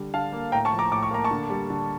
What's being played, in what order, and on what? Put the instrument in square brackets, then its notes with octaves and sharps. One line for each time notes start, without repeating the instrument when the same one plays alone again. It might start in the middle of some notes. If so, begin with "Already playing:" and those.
Already playing: [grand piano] D3 G3
D3 F5 A5
A#3
A2 G5 A#5
A5 C#6
F3
A#5 D6
A2 D6
C#6
A#3 A#5
A5 C#6
D3
G3
D3